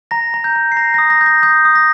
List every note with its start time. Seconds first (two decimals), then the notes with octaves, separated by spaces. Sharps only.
0.11 A#5 A#6
0.34 A#5
0.44 G6
0.56 A#5
0.72 C7
0.77 A#5 A#6
0.94 D#6 A#6
1.10 A#6
1.21 G6
1.26 A#6
1.43 D#6 G6
1.65 D#6
1.75 A#6